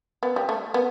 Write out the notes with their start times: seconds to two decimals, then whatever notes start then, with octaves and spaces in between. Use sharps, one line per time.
0.23 B3
0.36 G3
0.49 A3
0.74 B3